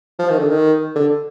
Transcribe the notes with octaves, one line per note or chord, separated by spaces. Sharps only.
F3
D#3
D3
D#3
D3